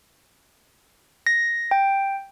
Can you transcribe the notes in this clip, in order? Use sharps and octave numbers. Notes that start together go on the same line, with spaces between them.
A#6
G5